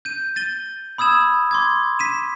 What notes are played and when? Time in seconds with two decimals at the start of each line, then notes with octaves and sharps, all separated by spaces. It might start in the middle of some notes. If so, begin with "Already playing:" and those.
0.05 G6 D#7
0.36 A6 D#7 G7
0.98 B5 D#6 E6 G#6 E7
1.51 C6 D6 G#6
1.99 B6 D#7 E7